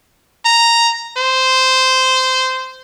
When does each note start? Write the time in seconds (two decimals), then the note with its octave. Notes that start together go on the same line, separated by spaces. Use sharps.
0.45 A#5
1.17 C5